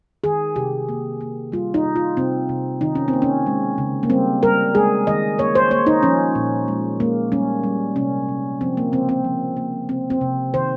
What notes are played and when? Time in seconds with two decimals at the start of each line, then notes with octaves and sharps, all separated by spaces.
0.24 D#3 G#4
0.56 C3 G4
0.89 A#3
1.21 A#3
1.52 G3 F4
1.74 D#4
1.85 C3
1.96 F4
2.17 C3 C4
2.49 C3
2.81 D#3 D#4
2.95 C#4
3.08 C4
3.13 A#3
3.22 C#4
3.46 G#3
3.78 C#3
4.03 A#3
4.10 G3 C4
4.43 G3 A#4
4.75 G#3 G#4
5.07 D#3 D#5
5.38 A#3 C#5
5.55 C5
5.71 A#3 C#5
5.87 D#4
6.03 F3 C#4
6.35 A#2
6.68 G#3
7.00 G#3 A#3
7.32 G3 C#4
7.63 G3
7.96 C3 C#4
8.29 C3
8.61 F3 C4
8.77 A#3
8.92 C#3 C4
9.09 C4
9.24 F3
9.57 A#3
9.89 C3 C4
10.10 C4
10.21 C3
10.54 D#3 C5